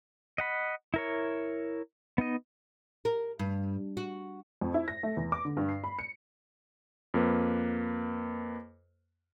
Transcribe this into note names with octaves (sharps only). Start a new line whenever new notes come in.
D#5 F#5 B5
E4 A#4 C#5
B3 D#4 D#5
A#4
G2
F#4
F2
E4
A#6
A3
E2
D6
D3
G2
C7
B5
C#7
F2 A#3 B4